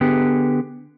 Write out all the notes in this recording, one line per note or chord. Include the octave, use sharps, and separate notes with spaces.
D3 B3 G4 G#4